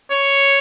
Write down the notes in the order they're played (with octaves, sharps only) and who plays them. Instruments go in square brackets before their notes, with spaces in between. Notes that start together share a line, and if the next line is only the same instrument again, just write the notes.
[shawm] C#5